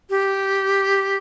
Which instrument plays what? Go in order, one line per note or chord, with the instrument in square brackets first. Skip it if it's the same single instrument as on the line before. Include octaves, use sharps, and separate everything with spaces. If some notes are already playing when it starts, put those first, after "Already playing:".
[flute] G4